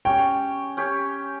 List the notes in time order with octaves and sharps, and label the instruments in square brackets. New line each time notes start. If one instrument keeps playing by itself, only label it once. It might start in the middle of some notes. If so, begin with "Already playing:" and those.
[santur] C#4 G4 C#5 [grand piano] G5
[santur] C#4 G4 C#5